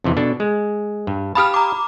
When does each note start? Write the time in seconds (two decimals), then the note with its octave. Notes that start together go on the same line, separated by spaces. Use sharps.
0.04 F2 C3 E3
0.17 B2 D4 A4
0.40 G#3
1.07 G2
1.35 G4 F5 A5 B5 D#6 F6
1.54 A#5 D6